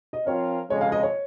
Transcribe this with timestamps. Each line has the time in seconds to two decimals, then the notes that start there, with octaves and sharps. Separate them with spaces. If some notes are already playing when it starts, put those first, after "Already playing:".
0.13 D#5
0.27 F3 C4 F4 A#4 C#5 F5
0.70 F2 C#3 G#3 C#5
0.81 F5
0.92 D#5
1.03 C#5